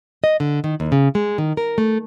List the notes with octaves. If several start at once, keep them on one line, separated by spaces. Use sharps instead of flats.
D#5
D3
D#3
D#2
C#3
G#3
D#3
A#4
A3